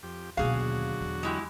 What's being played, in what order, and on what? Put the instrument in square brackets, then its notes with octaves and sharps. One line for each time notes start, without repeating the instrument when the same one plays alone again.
[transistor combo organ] F2 G4
[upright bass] D#2 B2 [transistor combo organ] D3 F#3 F#4 [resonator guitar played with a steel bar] G#4 F5
[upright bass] E2
[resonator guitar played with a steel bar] G#3 E4 G4